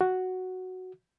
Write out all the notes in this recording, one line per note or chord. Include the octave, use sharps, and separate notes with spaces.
F#4